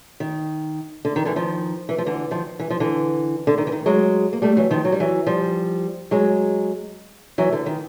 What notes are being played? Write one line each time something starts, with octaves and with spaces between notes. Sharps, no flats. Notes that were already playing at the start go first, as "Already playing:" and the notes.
D#3
D3
D#3
D3 E3
D#3 F3
E3
F3
D3 E3
D#3 F3
E3
F3
D3 E3
D3
D#3
E3
D#3
F#3 G#3
A#3
G3 A3
E3 F#3
D#3 F3
F#3
G3
E3 F#3
F3 G3
F#3 G#3
E3 F#3
D3 E3
D#3